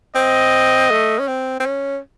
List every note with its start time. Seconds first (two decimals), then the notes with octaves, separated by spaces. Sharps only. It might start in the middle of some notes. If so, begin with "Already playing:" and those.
0.15 C4 D#5
0.91 A3
1.19 C#4
1.28 C4
1.60 C4
1.66 C#4